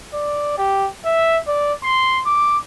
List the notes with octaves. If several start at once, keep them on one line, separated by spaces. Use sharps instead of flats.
D5
G4
E5
D5
C6
D6